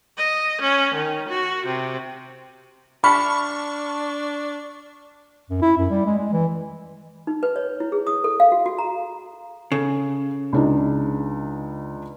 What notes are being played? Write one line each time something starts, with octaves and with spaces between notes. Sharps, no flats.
D#5
C#4
D#3
F#4
C3
D4 A5 B5 C#6 F6
F#2
E4
F#2
G3
G#3
G#3
E3
D#4
B4
C#5
E4
G#4
D#6
A4
F5
F#4
F#4
A#5
C#3 A4
C#2 D4 D#4